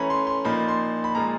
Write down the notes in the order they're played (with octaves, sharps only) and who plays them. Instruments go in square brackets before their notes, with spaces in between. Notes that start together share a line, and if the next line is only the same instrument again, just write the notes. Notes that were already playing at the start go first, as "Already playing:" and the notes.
Already playing: [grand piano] E3 A3 C#4 A#5 B5
C6
C6
A#2 F3 A#3 D#4 B5
C6
B5
A#2 F3 G#3 A#5